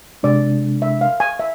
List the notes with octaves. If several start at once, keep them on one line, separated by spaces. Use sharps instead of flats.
C3 G#3 D4 D5
E5
F5
G#5
E5